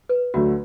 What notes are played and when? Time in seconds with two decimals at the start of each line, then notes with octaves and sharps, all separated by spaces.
0.09 B4
0.34 D2 D3 F#3 A3 F#4